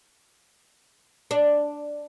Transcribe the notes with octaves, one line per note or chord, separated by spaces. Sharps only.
D4